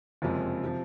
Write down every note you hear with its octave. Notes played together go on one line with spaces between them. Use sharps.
F#1 F2 C3 F3 G#3
C3 F3